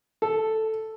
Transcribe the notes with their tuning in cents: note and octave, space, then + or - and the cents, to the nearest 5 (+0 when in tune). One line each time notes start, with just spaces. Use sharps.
A4 +0